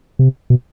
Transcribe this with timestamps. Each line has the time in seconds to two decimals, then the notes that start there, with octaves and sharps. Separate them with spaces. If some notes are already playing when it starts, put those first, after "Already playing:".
0.19 C3
0.50 B2